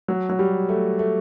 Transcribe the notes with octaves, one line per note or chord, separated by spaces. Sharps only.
F#3
F#3
G3
A3
A3